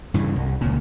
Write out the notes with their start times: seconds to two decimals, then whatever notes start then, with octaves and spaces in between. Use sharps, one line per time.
0.14 G2 C#3 E3
0.36 C2
0.61 C#2 A#2